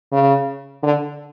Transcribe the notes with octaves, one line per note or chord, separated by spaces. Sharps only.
C#3
D3